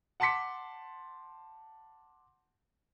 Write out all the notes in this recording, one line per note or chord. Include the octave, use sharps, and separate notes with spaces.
F#5 A5 C6 D6 B6 C#7